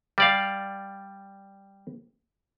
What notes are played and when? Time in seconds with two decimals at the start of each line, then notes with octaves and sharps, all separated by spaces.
0.18 G3 D5 F5